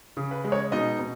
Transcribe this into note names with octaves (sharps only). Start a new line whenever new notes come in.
C#3
B4
G#3
C#5
B2 D#4 D#5
B2